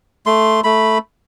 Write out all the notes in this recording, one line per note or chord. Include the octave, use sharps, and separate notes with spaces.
A3 C6
A3 B5